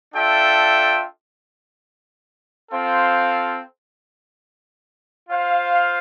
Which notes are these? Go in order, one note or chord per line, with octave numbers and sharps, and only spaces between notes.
D4 F4 A4 E5 G5
C4 F4 A4 C5 F5
F4 C5 F5